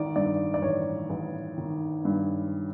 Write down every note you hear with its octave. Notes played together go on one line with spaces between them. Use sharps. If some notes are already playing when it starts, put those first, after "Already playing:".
Already playing: A1 D#3 D5
G2 D5
D5
A1 C#5
A1
D#3
G2